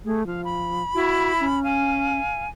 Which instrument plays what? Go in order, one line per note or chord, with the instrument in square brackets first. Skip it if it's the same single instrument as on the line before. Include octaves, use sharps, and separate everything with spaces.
[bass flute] A3 [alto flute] G#4
[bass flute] F3 [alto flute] F5
[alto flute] B5
[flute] E4 [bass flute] F#4
[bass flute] C#4
[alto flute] F5 [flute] G#5